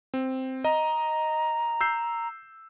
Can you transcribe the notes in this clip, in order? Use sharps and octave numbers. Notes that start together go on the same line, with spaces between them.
C4
D#5 A#5
E6 G6 C7